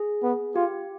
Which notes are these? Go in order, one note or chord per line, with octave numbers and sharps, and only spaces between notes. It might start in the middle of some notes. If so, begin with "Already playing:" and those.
Already playing: G#4
B3
F4 G4